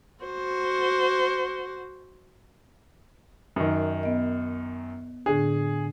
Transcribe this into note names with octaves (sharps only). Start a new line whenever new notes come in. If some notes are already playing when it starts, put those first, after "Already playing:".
F#4 C5
F#2 D#3
B3 D#5
A2 D3 D4 G#4